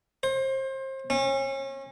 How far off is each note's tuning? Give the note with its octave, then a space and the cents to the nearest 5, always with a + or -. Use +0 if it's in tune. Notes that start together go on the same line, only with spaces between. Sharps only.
C5 +30
C#4 -35